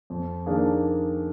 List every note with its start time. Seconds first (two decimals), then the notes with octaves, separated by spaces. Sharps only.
0.10 F2
0.46 D#3 A#3 D4 G#4